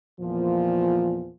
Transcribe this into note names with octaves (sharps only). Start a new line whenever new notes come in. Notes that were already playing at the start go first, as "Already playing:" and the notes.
E2 A#2 F3